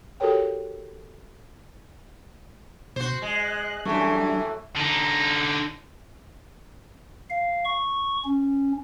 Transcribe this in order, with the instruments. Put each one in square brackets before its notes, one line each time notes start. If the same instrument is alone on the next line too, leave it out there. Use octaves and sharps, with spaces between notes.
[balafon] F#4 G4 A4 A#4 C#5 G5
[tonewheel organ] B2 [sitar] F#4 C5
[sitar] G#3 [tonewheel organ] D#5 F#6
[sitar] F#2 E3 [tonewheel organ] F#3 G3 D4 [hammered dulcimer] A3 G5
[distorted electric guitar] D3 D#4
[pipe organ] F5
C#6
C#4